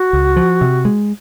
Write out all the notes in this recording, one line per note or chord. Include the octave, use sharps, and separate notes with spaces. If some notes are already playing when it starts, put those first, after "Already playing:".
Already playing: F#4
C#2
F3
C3
G#3